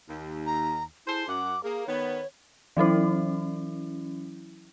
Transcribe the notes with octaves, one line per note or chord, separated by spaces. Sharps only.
D#2
A#5
E4 G#4 A4 C5
F#2 F#5 D6
A#3 G#4
D#3 B3 C#5
E3 F#3 C#4 E4